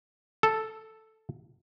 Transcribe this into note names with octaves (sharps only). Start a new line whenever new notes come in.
A4